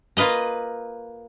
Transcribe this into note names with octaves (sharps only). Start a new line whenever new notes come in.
A#3 F4 B4 D#5 A#5